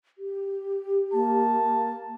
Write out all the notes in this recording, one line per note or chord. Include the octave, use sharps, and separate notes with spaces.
G4
A#3 A5